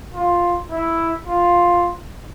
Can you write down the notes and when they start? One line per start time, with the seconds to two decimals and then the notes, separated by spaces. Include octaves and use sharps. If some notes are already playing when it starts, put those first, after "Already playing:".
0.14 F4
0.70 E4
1.27 F4